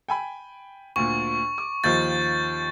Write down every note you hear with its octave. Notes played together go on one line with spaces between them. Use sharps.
G5 G#5 B5
D2 A#2 C#6
D6
D#2 D#3 F3 G6 A6